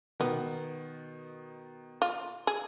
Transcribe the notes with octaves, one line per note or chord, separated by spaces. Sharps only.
B2 D#3 B3
F4
G#4